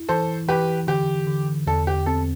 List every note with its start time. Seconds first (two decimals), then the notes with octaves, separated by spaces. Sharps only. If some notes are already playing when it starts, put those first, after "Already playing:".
Already playing: E4
0.09 E3 A4 C5
0.48 E3 G4 B4
0.87 D3 G4
1.27 D3
1.67 E2 A4
1.87 G4
2.06 C4 A4